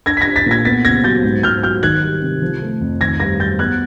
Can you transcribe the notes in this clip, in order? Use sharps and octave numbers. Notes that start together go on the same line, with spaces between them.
D4 G#6 A#6
B6
G#6 A#6
D4
A6 B6
A#2 G#6 A#6
B3 A6 B6
C#3 G#6 A#6
F#3 G6 A6
G#2
G#2 F6 G6
F#3 F6 G6
D#3 F#6 G#6
G3
C3
F3
A3
F2
D#3 G#6 A#6
G2 G#6 A#6
F#3 G6 A6
B3 F#6 G#6